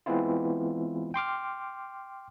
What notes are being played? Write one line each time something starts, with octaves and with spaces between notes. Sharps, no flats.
E3 G#3 B3 C4 E4 F4
G5 C6 D6 F6